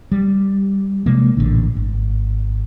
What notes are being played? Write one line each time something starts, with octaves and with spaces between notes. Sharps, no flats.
G3
C3 F3 G#3 A#3
A1 A#2 D3
G#1